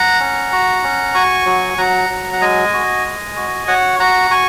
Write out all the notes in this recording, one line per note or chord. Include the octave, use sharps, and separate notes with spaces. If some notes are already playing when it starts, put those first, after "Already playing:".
Already playing: F#5 A#5
C#4
F#4
C#4
F#4 G#5 C#6
F#3
F#3 F#5 A#5
F#3
F#5
G#3 D#5 G#5
F#4
G#3
F#4
F#4 C#5 F#5
F#4 F#5 A#5
F#4 G#5 C#6